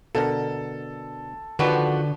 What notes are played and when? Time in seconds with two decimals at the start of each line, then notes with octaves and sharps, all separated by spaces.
0.15 B2 D3 A4 A#4
1.59 D3 D#3 F3 F#4 G4 B4